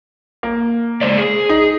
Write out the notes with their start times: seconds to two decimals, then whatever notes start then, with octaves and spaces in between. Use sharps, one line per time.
0.43 A#3
1.01 G#3 C5 D5
1.18 G#4
1.49 D#4